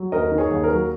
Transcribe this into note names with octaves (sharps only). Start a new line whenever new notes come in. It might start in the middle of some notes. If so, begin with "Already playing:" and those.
Already playing: F#3
D#2 A#4 D#5
D#3
G#4 C#5
D#2
A#4
F#3